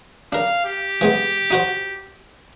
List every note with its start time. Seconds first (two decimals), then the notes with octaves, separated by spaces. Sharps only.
0.32 D4 A#4 F5
0.65 G4
1.01 E3 G#3 B3
1.51 D#4 F#4 C5